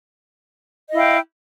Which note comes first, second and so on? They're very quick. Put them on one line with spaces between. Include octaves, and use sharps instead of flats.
D#5 E4 F5 G5